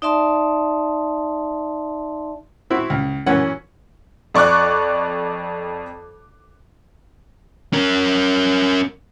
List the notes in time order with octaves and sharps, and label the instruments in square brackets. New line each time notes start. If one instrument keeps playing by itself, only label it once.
[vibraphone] D#4 D5 E5 A5 C6
[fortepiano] C4 E4 F#4
C#2
F#2 E3 C#4 F#5
[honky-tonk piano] F2 D5 C#6 D6 F#6
[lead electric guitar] C#4 A#4